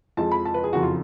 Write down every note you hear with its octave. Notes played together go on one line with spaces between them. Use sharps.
F2 F3 G#3 A5
B5
A5
B4
G#4
F#1 F2 C#3 F#4
F4